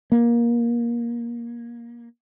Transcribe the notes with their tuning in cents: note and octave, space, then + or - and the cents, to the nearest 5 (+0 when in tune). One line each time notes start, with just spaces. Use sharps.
A#3 +20